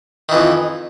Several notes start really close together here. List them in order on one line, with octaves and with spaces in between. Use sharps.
D#3 E3 F2